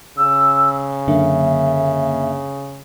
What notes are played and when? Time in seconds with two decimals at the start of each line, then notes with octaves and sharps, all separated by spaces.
0.18 C#3 E6
1.07 F#2 D3 A#3 E5